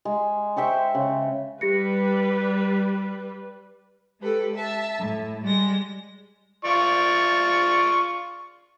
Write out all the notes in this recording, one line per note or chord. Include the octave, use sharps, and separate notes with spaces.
G#3
C5 E5 G5 C#6
C#3
G3 G4 B4 A#6 C#7
G#3 G4 A4 B4
E5 A5
A2
G3 G#3 A#6
F4 D5 C#6